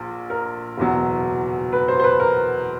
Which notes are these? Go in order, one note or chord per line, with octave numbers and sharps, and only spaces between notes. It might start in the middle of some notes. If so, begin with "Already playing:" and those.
Already playing: A#1 A#2
A#4
F#1 E2 B2 F#3
B4
C5
C5
B4
A#4